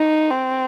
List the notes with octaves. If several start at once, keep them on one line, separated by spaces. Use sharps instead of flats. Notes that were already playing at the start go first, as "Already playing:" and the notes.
Already playing: D#4
C4